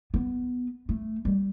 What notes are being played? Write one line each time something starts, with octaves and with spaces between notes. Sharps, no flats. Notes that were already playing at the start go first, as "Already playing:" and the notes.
B3
A3
G3